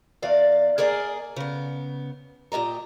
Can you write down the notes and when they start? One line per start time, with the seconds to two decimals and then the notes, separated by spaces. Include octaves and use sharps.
0.22 E2 D5 F5
0.78 A#3 G#4 A#4 D5 D#5 G#5
1.36 C#3 B3
2.52 A#2 G4 D#5 A#5